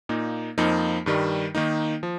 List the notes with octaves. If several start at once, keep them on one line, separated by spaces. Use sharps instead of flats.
A#2 A#3 D#4
F2 F3 A#3 D#4
G2 D#3 G3
D#3 A#3 D#4
F3